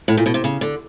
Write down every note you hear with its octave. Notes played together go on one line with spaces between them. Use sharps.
A2
A#2
B2
C3
C#3
D3